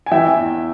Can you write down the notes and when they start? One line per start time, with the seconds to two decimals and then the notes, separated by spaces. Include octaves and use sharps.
0.06 G#5
0.11 E3 E5 G5
0.36 E2